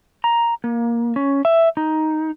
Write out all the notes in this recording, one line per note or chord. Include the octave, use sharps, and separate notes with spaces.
A#5
A#3
C#4
E5
D#4